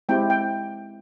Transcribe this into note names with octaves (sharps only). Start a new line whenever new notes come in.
G#3 C4 E4 G4 G5
G5